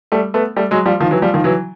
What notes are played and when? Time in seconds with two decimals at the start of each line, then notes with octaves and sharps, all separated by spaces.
0.12 G3 A3
0.34 A3 B3
0.56 G3 A3
0.71 F#3 G#3
0.86 F3 G3
1.00 D#3 F3
1.11 E3 F#3
1.22 F3 G3
1.34 D#3 F3
1.44 E3 F#3